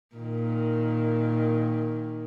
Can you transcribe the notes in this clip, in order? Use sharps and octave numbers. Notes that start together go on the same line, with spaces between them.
A#2 D#3